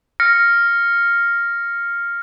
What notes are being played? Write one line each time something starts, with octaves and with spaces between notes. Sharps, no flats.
F6 A#6 C#7